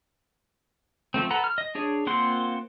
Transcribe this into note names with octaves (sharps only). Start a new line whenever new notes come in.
F3 A3 C4
A4 B4 F#5 A#5
F6
D#5
D4 G#4 C#5
A#3 C4 F4 F#5 C6